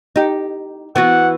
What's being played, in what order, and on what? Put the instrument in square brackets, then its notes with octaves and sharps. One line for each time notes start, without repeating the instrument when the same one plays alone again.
[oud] D#4 G4
[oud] E3 B3 F#4 [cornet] F#5